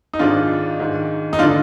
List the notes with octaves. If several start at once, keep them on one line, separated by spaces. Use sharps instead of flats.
D#4
G#2 D#3 D4 F4
G#2 D#3
D#4
D4 F4
D3